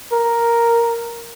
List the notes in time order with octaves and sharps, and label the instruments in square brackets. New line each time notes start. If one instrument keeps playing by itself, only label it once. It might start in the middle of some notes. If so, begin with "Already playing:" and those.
[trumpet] A#4